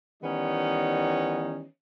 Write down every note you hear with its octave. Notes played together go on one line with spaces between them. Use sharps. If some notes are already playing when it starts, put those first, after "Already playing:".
D#3 E3 G3 B3 C#4 D#4